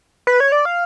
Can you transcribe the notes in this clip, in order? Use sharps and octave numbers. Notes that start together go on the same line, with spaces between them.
B4
C#5
D5
F5